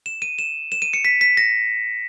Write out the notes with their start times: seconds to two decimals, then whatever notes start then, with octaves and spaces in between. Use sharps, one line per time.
0.06 E7
0.22 D#7
0.39 E7
0.72 E7
0.82 D#7
0.93 C#7
1.05 B6
1.21 B6
1.37 A#6